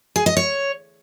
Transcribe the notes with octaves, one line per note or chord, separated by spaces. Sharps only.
G#4
D#5
C#5